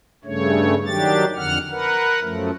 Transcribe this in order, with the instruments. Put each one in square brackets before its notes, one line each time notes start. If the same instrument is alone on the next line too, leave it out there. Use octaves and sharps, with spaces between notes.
[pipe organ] G2 C#3 A3 C#5
D#3 F#3 D4 G4 A6
F2 D3 F#5 F6
A#4 B4 F#5
F#2 F3 A3